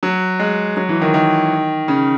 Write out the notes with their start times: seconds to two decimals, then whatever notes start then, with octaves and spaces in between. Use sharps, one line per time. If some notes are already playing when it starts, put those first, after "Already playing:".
0.03 F#3
0.39 G#3
0.77 F#3
0.89 E3
1.01 D#3
1.14 D#3
1.88 C#3